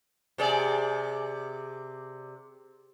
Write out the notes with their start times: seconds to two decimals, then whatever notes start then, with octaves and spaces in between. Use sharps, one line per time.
0.38 C3 G#4 D5